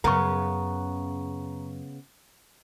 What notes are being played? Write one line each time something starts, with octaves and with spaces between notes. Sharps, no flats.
F#2 C#3 B3 A#4 A#5 C#6